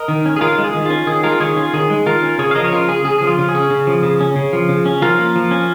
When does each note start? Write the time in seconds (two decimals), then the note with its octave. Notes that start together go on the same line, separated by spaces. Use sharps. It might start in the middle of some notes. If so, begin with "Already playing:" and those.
Already playing: A#4 D#5
0.08 D#3
0.26 C#4
0.36 G#4
0.41 D#3 F4 A#4
0.58 G#3
0.64 G#4
0.74 D#3
0.85 F4
0.90 C#4
1.07 D#3 G#4
1.23 G#3 F4 A#4
1.40 D#3 G#4 C#5
1.56 C#4 F4
1.73 D#3 G#4
1.90 G#3
2.06 D#3 F4 A#4
2.23 C#4
2.38 C#3 G#4 C#5
2.51 F5
2.55 F3 A#4 D#5
2.64 C#5
2.72 C#3 F4 A#4
2.88 C#4 G#4
3.05 C#3 G#4
3.18 F3 G#4
3.27 F4
3.38 C#3
3.49 G#4
3.55 C#4
3.71 C#3
3.87 F3
4.03 C#3
4.20 C#4
4.36 C#3
4.53 F3
4.69 C#3
4.86 C#4
5.02 F3 F4 A#4
5.19 A#3
5.36 F3
5.51 C#4